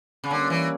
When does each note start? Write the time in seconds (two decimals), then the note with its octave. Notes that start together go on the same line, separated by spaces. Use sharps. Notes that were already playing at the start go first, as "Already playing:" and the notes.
0.24 C#3
0.31 D3 G3 A#3 C#4
0.50 E3